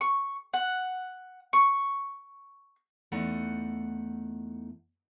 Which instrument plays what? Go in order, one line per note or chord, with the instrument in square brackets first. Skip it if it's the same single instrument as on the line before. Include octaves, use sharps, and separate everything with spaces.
[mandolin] C#6
F#5
C#6
[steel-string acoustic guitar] E2 A3 D#4 F#5